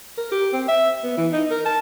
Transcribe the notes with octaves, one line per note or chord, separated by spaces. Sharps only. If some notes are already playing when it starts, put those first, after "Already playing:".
A#4
G4
C4
E5
B3
E3
D#4
A#4
A5